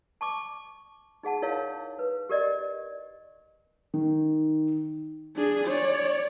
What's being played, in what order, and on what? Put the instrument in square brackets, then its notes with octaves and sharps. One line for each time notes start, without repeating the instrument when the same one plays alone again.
[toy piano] A5 C#6 D6
D#4 G#4 F#5 A5
D#4 E4 A#4 C#5 F5
B4
G4 A#4 D5 D#5
[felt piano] D#3
[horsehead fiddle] D4 G#4
C#5 D5